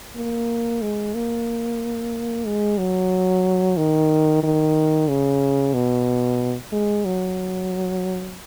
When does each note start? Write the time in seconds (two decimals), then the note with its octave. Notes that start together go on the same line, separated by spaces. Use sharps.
0.16 A#3
0.82 G#3
1.14 A#3
2.46 G#3
2.78 F#3
3.77 D#3
4.43 D#3
5.09 C#3
5.74 B2
6.73 G#3
7.05 F#3